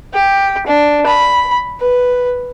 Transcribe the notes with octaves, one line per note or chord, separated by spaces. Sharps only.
G4
D4
B5
B4